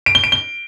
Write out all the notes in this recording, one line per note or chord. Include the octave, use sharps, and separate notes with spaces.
D7
G7
D7
G7